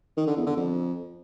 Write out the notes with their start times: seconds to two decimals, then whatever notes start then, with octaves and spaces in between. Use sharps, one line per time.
0.17 D#3
0.27 D3
0.37 E2
0.47 D3
0.57 F2